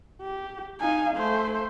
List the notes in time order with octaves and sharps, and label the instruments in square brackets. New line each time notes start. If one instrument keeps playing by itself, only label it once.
[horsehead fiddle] G4
[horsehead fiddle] D#4 F5 [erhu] G#5
[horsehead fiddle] A3 [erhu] C5